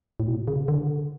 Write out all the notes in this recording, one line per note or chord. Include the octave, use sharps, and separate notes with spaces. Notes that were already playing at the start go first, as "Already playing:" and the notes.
A2
B2
C#3
D3